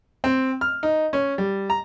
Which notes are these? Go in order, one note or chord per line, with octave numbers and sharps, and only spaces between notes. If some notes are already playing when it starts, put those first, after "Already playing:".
C4
F6
D#4
C#4
G3
A#5